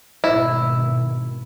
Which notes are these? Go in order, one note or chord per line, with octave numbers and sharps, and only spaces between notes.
G#1 B2 D#3 E4